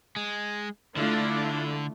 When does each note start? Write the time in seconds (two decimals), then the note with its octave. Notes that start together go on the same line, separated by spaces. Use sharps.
0.16 G#3
0.97 D3 A3 D4 E4 F4